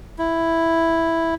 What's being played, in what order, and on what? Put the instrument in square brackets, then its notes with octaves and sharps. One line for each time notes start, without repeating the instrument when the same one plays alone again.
[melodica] E4